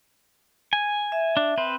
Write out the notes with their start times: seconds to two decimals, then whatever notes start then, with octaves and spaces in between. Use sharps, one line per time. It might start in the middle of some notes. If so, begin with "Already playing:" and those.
0.73 G#5
1.12 E5
1.37 D4
1.58 C4 B4 C5